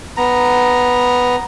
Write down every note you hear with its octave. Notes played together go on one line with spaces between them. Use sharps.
B3 A#5